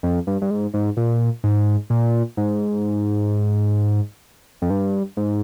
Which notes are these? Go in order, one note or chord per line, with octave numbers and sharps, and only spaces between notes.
F2
G2
G2
G#2
G#2
A#2
G#2
A#2
G#2
F2
G2
G#2